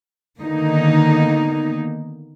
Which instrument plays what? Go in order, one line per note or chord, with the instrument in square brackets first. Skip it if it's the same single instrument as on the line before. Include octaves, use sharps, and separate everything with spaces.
[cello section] D3 D#3 A#3 B3 D#4